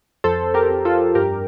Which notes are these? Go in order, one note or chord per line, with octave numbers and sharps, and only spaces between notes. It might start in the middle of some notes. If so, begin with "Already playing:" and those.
F2 A4 C5
G4 A#4
F2
F4 A4
G2 G4 A#4